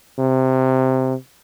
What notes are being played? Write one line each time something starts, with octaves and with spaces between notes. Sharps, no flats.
C3